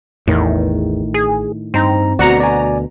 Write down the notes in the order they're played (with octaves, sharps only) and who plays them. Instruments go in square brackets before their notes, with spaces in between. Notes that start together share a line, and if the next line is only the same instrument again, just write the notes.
[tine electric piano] A1 [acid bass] E2 [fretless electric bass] A2 D#3
[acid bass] G#4
[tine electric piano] G2 D#4 A#5 [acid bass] C4
[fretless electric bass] D2 B2 [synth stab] F#4 A#5 [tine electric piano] D5 C#7
[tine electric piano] D5 G#5